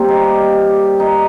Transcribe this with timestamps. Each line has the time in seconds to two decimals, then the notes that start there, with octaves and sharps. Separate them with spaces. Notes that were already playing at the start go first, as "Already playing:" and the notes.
Already playing: A#2 G3 A#3 C4
0.08 D#4
0.24 G4
1.00 D#4